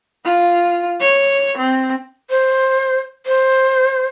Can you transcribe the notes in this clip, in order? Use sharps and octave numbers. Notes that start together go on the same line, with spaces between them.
F4
C#5
C4
C5
C5